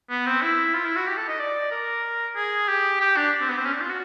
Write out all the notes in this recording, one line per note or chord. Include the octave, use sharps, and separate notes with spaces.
B3
C4
E4
F4
E4
F#4
G4
A4
D#5
D5
A#4
G#4
G4
G4
D4
C4
B3
C4
C#4
D4
F4
F#4